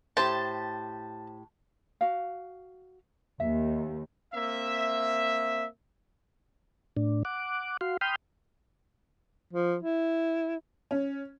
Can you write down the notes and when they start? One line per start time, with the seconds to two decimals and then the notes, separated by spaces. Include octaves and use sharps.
0.17 A2 G4 C5 A5
2.01 F#4 F5
3.40 D#2 E5
4.34 A#3 C4 E5
6.96 A2 D4
7.25 F#5 D6
7.81 F#4 F5 C6
8.01 G5 B5 C6 D#6 F6 G6
9.53 F3
9.82 E4
10.91 C#4